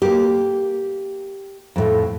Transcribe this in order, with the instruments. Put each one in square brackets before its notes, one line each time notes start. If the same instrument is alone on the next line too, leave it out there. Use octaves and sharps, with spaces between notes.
[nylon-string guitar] A#3 G4
F2 A2